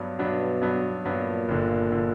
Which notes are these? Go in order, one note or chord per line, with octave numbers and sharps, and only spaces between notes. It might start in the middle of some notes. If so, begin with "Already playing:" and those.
Already playing: G2 F#3 B3 D4
G2 B2 F#3 B3 D4
G2 F#3 B3 D4
G2 A#2 F#3 B3 D4
G1 G2 D3
D3